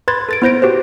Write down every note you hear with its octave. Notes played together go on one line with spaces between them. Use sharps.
B4 B5 C6 G#6 A6
A4 A6 D7
B3 E4 C5 G6 A#6 D7
F#4 G4 B4 C5